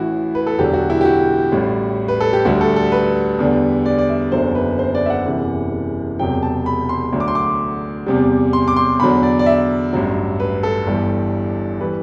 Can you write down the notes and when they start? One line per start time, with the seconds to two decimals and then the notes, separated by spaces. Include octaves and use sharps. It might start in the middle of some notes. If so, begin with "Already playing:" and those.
Already playing: A1 A2 E3 E4 F#4
0.35 B4
0.47 A4
0.58 E1 E2 D3 F#3 G4
0.73 F#4
0.90 E4
1.01 G4
1.05 F#4
1.52 A1 A2 G3
2.08 B4
2.20 A4
2.33 G4
2.45 D2 D3 G3 F#4
2.61 A4
2.76 A4
2.92 B4
3.39 E2 D3 G3
3.86 D5
3.99 D5
4.09 E5
4.32 F#1 E2 D3 F#3 C5
4.55 B4
4.79 C5
4.95 D5
5.06 E5
5.10 F#5
5.26 F#1 E2 C3 E3
6.19 E1 E2 C3 F#3 G5
6.43 A5
6.66 B5
6.89 C6
7.13 D2 D3 F#3
7.20 D6
7.28 C6
7.35 D6
8.06 E2 C3 G3
8.53 C6
8.68 D6
8.76 C6
8.99 E2 D3 F#3 B5
9.23 D5
9.39 D5
9.46 E5
9.93 A1 G2 F#3
10.40 B4
10.63 A4
10.87 G1 G2 E3 G3
11.80 E3 G3 B4